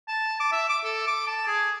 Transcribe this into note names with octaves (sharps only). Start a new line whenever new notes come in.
A5
D6
E5
D6
A4
D6
A5
G#4